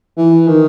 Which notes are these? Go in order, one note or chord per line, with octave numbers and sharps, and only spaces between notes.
E3
D#3